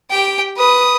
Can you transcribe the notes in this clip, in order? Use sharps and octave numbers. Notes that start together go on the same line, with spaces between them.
G4 G5
B4 D#6